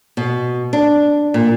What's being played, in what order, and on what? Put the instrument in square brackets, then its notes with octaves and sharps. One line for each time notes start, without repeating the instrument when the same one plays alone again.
[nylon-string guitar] B2
D4
A#2